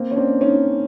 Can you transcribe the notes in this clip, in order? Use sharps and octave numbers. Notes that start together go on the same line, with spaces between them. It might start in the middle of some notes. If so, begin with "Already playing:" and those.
Already playing: A#3 C4
C#4
C4 D4
C#4 D#4